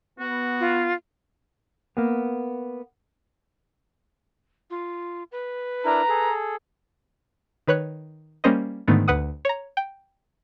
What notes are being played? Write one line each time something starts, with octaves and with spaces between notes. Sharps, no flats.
B3 F#4
F4
A#3 B3
F4
B4
D4 E4 A#4 A#5
G#4 A4
D#3 B4 C#5 F#6
G3 A#3 C#4 A#4 C5 D#5
G#2 D3 D#3 A3 B3
D2 B4 F#5 D#6
C#5 A#5
G5